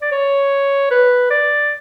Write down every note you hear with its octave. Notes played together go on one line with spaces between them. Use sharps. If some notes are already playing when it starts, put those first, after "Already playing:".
D5
C#5
B4
D5